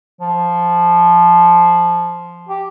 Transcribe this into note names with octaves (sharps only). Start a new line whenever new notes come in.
F3
G4